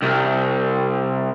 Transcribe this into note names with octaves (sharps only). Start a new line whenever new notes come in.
C2